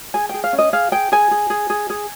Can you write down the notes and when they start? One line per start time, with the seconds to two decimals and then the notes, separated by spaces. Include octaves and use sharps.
0.14 G#4 G#5
0.29 G#4 G5
0.44 F5
0.53 C#4
0.58 D#5
0.73 G#4 F5
0.92 G#4 G5
1.12 G#4 G#5
1.31 G#4
1.50 G#4
1.70 G#4
1.90 G#4